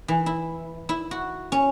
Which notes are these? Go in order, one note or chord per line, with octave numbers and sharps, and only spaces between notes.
E3
E4
E4
F#4
C#4